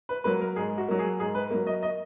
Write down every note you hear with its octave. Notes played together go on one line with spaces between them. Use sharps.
B4
F#3 A#3 B4
A#4
G#2 G#4
F#4
F#3 A#3
G#4
G#2 G#4
B4
F#3 A#3
D#5
D#5